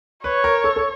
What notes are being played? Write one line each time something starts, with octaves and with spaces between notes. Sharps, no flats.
B4 C#5
A#4
A4
A4